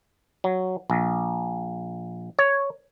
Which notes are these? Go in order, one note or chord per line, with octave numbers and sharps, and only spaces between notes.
F#3
A#1
C#5